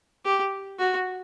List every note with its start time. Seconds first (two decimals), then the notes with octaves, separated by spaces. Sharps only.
0.25 G4
0.79 F#4